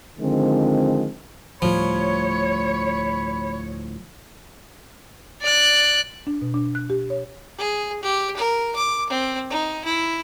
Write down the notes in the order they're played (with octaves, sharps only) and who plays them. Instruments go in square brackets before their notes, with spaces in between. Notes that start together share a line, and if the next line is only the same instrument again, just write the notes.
[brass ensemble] D3 D#3 F3 G#3 C4
[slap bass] D2 A2 G3 [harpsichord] F3 [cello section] C#5 [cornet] B5
[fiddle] D5 F#6
[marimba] D4
B2
D4
F#6
G4
C#5
[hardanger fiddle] G#4
G4
A#4
D6
C4
D#4
E4